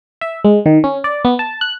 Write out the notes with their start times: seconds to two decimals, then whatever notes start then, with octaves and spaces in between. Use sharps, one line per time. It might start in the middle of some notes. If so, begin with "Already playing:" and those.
0.21 E5
0.44 G#3
0.66 D#3
0.84 C#4
1.04 D5
1.25 B3
1.39 A5
1.61 F#6